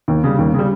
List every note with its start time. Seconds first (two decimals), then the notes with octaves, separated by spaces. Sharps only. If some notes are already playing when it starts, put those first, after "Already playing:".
0.08 D#2
0.24 C#3 G3
0.39 D#2
0.54 C#3
0.59 G3